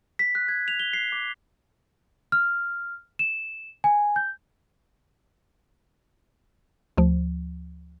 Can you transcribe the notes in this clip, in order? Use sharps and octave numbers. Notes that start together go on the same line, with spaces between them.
B6
F#6
G#6
F7
G7
C7
D6
F6
E7
G#5
G6
D2 F3